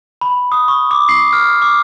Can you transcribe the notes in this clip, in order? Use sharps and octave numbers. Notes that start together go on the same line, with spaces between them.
B5
D#6
C#6
D6
C7
F6
D6